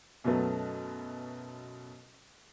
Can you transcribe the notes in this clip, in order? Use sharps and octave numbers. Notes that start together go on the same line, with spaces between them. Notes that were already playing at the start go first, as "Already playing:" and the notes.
F#2 B2 F#3 A3 B3